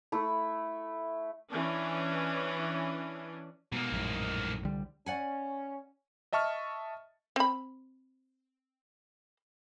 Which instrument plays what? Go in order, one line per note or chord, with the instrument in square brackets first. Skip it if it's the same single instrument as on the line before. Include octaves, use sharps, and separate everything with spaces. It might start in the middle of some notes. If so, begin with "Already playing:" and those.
[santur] A3 E4
[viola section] E3 C#4 D4
[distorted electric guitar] G#2 A#3 [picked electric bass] B2
[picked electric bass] A#1 F#2 A2
C2 D3 G3
[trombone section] C#4 [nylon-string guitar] D5 F#5 G#5
[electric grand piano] D#5 E5 A5 C#6 F6
[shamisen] C4 B5